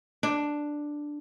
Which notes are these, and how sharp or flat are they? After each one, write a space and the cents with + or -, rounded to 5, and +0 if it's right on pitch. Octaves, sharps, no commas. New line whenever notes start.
D4 +5